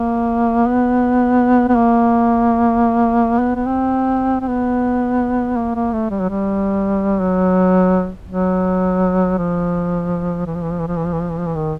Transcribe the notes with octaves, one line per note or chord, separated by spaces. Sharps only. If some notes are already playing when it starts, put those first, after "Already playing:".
Already playing: A#3
B3
B3
A#3
B3
B3
C4
C4
B3
A#3
A#3
A3
G3
F#3
G3
F#3
F#3
F3
E3
F3
E3
F3
E3
F3
E3
F3
E3
F3
E3
F3
E3
D#3